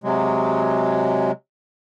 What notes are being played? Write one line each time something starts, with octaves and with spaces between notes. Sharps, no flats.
C3 F#3 G#3